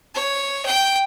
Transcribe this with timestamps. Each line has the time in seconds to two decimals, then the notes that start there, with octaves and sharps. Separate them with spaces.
0.15 C#5
0.66 G5